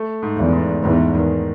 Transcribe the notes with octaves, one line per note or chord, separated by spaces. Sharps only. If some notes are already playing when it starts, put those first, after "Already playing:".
Already playing: A3
G#2
E2
G#2
E2 G#2
D#3